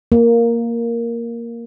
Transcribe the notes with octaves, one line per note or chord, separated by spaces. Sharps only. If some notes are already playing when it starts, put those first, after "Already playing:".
A#3